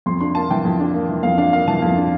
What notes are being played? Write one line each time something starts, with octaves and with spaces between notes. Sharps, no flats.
F2 C6
D4 C6
A#3 A5
E3 G5
F2
D4
A#3
E3
F2 F5
D4 F5
A#3 F5
E3 A5
F2
D4